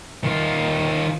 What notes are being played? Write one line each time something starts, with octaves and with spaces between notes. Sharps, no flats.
D#3 F4